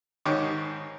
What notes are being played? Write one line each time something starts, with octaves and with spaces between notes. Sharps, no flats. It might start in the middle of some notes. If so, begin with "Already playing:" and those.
G#1 G#2 D#3 G4 C#5 D6